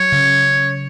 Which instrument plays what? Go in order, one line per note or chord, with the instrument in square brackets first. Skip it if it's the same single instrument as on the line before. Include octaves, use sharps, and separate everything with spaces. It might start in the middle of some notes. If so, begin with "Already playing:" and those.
Already playing: [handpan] F#3 [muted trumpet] C#5
[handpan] C#3